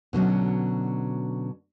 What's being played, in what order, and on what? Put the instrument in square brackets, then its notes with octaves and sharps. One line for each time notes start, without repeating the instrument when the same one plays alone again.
[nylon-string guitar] B2 D3 F#3 C#4